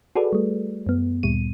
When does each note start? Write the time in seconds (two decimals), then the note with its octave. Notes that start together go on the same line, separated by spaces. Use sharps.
0.16 F#4 G#4 A4 B4 D5
0.33 G3 A3
0.86 F#2 B3
1.23 D2 A#2 G3 D#7